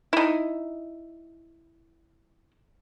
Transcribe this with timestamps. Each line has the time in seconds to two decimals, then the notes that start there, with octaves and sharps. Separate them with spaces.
0.13 D#4 E4